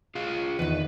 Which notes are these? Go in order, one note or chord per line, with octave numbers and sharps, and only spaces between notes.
F4 G#4 F5
E2 D#3 B4